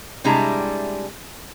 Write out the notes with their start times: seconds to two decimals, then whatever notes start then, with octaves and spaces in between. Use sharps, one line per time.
0.24 C3 G3 G#3 D4 E4 A#5